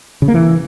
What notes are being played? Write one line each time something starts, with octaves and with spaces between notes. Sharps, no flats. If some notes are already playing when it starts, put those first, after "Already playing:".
C#3
A#3
E3